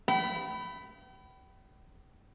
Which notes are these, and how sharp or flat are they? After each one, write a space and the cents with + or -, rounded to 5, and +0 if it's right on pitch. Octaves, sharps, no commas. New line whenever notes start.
G5 -40 B5 +10